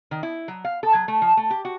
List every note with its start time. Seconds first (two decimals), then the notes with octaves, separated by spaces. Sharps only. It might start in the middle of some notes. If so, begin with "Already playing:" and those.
0.11 D#3
0.23 E4
0.48 F#3
0.65 F5
0.83 A4
0.94 F#3
1.08 A3
1.22 F3
1.37 A3
1.50 G4
1.65 F#4